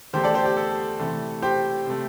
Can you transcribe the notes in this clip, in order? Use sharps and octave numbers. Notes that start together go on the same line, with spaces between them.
E2 D3 A3 G4 C5
A4 D5
G4 C5
G4
A4
C3 E3 A3
G4 C5
C3 A3